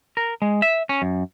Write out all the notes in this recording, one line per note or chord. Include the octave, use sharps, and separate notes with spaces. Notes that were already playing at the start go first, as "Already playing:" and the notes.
A#4
G#3
E5
C#4
F#2